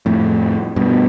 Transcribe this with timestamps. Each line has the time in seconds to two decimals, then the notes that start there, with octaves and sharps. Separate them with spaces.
0.06 F2 A2
0.76 G2 B2